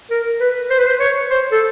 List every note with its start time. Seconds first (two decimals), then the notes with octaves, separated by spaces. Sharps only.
0.10 A#4
0.40 B4
0.70 C5
0.79 B4
0.87 C5
1.00 C#5
1.30 C5
1.52 A4